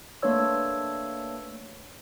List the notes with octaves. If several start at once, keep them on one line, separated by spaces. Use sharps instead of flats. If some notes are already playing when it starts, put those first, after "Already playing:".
A3 A#3 D4 B4 C#5 E6